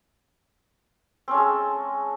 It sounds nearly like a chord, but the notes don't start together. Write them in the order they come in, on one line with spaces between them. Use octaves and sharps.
C4 C#4 A4 G#3